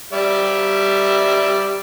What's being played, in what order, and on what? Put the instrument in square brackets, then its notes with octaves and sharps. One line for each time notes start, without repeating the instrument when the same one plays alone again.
[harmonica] G3 D5 E5